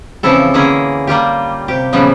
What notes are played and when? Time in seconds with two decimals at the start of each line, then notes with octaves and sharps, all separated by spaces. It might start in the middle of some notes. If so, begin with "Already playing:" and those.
0.23 C#3 E3 F3 C4 E4 A4
0.54 D3 E3 A#3 C#4 E4 G#4
1.07 G3 A#3 F4 G4
1.68 C3 G4
1.93 A#2 C#3 E3 F3 G3 B3